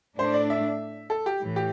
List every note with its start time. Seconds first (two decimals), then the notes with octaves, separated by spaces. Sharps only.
0.19 A2 A3 D4 C5
0.34 D5
0.50 E5
1.10 A4
1.26 G4
1.41 A2 E3
1.56 G4